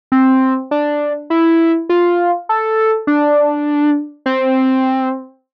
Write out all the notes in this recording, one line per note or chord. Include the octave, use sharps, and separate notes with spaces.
C4
D4
E4
F4
A4
D4
C4